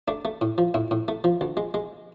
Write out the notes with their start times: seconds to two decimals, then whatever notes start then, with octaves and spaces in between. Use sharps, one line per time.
0.08 A3 D4
0.25 A3
0.41 A2
0.58 F3
0.74 A2 E4
0.91 A2
1.08 A3
1.24 F3
1.41 D2
1.57 G#3
1.74 G#3